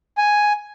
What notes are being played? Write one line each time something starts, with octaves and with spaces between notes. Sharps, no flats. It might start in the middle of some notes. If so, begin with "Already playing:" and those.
G#5